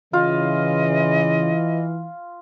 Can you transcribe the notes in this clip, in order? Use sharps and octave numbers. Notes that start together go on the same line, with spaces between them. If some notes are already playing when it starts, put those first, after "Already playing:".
C#3 E3 F4 D#5